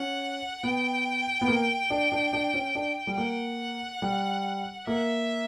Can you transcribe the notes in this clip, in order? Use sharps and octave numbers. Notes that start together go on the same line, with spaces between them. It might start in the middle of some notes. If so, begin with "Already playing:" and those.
Already playing: C#4 F#5
B3 G5
B3
A#3
D4
D4
D4
C#4
D4
G3
A#3 F#5
G3
A#3 E5